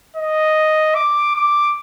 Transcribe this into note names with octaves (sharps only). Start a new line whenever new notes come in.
D#5
D6
D6